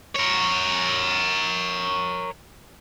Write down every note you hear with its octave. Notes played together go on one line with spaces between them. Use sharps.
A#4 C#5